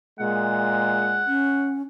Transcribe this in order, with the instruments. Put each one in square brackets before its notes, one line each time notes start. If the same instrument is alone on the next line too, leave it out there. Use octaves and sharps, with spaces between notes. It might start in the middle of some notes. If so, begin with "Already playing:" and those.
[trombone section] A#2 G#3 [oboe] F#5
[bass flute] C#4